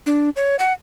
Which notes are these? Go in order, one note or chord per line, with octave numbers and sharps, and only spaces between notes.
D4
C#5
F#5